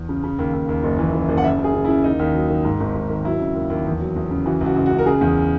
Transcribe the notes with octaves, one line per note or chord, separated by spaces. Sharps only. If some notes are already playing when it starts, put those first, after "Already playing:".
Already playing: E2
C#3
C#3
D#2
D#2
D#2
F#1
E3
F#1
F#1
F#5
C#3 E5
C#3
G#4
C#3
E4
C#3
D#2 D#4
D#2
F#3
D#3
G#2
G#1
G#2
D#3
F#3 E4
C#3
D#2
D#2
E2
F#3
E2
C#3
E3 F#4
C#2
F#4
C#2
F#4
C#2
A#4
C#3 G#4
E2